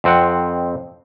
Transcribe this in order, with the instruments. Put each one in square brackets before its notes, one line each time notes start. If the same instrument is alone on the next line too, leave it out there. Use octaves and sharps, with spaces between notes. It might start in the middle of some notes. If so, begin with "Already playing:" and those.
[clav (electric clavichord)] F2 C4 F#5